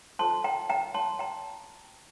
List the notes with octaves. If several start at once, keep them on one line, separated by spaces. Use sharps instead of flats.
F4 A4 C5 A5 C6
G5 A#5
G5 A#5
A5 C6
G5 A#5